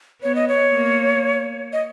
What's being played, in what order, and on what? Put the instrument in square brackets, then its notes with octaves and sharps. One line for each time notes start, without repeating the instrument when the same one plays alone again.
[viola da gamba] B3 [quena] C#5
[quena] D#5
C#5
[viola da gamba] A#3
[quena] D#5